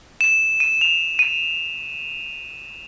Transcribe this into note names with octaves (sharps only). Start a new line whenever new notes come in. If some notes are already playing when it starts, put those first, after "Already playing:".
E7
D#7
F7
D#7